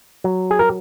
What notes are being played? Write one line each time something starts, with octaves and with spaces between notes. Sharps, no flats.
F#3
G#4
A#4